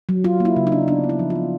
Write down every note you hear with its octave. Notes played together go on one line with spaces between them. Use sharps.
F#3
F#3 F4
A#3
E4
C#3
D#4
D4
B3 D4
B3
E4
F3
F4
B3